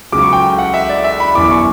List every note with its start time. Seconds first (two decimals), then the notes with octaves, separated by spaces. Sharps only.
0.12 C#2 C#3 F#3 D6
0.23 C#6
0.33 G5
0.43 G5
0.59 F#5
0.74 E5
0.89 D5
1.04 E5
1.20 B5
1.35 G1 F#2 E3 D6
1.51 C#6